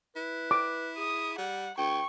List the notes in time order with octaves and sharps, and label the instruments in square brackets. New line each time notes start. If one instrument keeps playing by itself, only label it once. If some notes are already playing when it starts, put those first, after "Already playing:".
[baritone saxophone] E4 [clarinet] B4
[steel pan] D6
[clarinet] G#4 [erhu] D#6
[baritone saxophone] G3 [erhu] F#5
[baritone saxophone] D2 [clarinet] G5 [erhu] C#6